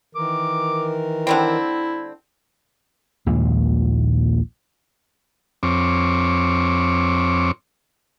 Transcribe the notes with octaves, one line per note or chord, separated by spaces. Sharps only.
D#3 E3 A#4 D6
D3 G3 C4 E4
A#1 D#2 A#2 G#3
F2 C4 C#5 D6